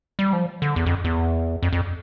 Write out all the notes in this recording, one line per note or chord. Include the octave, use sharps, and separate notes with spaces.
G3
F3
D3
E2
F2
E2
F2
F2